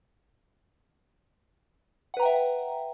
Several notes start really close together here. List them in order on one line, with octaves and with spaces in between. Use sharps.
F#5 B4 A#5 G5 E5